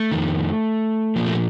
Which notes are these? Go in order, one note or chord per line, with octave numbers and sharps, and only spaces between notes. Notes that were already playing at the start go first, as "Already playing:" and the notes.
Already playing: A3
F2 D#3
A#2 F3 A#3
A3